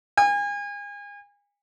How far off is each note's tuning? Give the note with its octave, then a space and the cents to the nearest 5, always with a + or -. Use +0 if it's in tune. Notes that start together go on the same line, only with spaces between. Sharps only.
G#5 -35